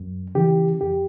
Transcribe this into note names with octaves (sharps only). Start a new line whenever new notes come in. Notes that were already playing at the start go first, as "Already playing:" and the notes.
Already playing: F#2
C#3 E3 G4
F2 G4